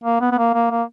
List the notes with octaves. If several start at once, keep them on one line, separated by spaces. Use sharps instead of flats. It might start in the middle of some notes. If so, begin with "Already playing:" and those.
A#3
B3
B3
A#3
A#3
A#3